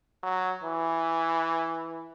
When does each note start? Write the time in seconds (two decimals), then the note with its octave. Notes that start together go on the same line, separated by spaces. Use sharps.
0.23 F#3
0.63 E3